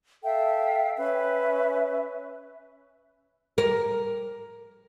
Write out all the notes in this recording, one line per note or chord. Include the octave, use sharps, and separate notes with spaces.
A4 E5 F5 G5
C#4 B4 E5
A#4